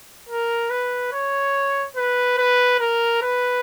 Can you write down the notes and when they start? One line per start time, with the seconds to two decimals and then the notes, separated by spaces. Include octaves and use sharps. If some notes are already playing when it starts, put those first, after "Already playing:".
0.29 A#4
0.70 B4
1.12 C#5
1.96 B4
2.38 B4
2.80 A#4
3.22 B4